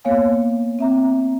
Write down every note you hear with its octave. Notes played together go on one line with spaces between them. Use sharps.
A#3 B3 C#5 F5 G#5
C4 E5 A#5